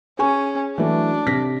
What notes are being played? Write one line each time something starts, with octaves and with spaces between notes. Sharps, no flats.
C#4 G#4 G#5 C#6
E3 F#3 A3 D4
C3 A#6 B6